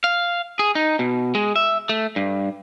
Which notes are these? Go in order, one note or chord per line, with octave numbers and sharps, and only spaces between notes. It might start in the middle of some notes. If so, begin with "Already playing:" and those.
F5
G#4
D#4
B2
G#3
E5
A3
G2